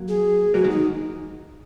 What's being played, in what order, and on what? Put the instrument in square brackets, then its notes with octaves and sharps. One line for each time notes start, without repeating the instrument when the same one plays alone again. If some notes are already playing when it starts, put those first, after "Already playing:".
Already playing: [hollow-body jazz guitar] F#3 A#3
[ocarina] G#4
[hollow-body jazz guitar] F#3 A#3 [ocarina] F#4
[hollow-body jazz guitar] D#3 G#3
[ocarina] D#4